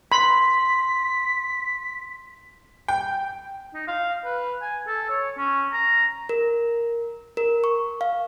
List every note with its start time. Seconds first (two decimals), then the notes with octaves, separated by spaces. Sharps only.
0.12 B5 C6 B6
2.88 G5
3.74 D#4
3.88 F5
4.25 B4
4.62 G#5
4.88 A4
5.10 C#5
5.38 C#4
5.73 A#5
6.29 A#4
7.37 A#4
7.64 C#6
8.01 F5